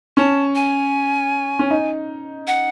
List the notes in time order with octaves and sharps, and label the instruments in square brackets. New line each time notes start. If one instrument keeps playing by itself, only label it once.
[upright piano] C#4 [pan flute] A5
[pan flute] G#5
[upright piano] C#4
D#4
[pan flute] F#5